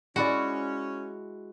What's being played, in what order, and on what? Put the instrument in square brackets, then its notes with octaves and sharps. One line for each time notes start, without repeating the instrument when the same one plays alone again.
[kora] G#3 E4 D5 [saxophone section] C#4 [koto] F#4